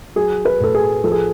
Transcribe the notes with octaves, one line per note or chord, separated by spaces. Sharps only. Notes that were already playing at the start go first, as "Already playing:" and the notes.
F#3 G#4
B4
A2 A4
G#4
F3 A4
G#4